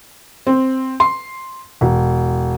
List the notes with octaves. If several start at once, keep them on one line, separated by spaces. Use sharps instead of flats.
C4
C6
E1